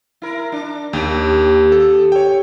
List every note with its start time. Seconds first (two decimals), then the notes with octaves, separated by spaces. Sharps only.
0.22 E4 A#4
0.52 D4
0.93 D#2 G4
1.72 A4
2.12 C#5 G5